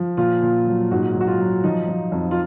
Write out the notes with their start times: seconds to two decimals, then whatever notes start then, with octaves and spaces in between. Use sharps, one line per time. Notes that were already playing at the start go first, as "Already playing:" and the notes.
Already playing: F3
0.17 A#2 F4
0.42 A#2
0.67 F#3
0.91 G#2 F#4
1.15 F#3
1.21 F#4
1.27 F4
1.40 F#3
1.64 F3 D#4
1.88 F3
2.12 F2
2.31 F4